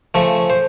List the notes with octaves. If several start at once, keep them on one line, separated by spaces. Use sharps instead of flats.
C#3 F3 A3
C5